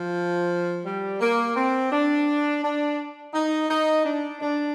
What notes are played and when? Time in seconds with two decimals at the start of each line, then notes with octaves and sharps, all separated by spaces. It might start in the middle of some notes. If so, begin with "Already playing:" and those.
Already playing: F3
0.85 G3
1.21 A#3
1.56 C4
1.92 D4
2.62 D4
3.34 D#4
3.69 D#4
4.05 D4
4.41 D4